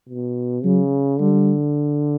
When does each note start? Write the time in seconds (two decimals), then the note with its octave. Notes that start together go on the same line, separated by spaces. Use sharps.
0.09 B2
0.64 C#3 F#3
1.19 D3 G3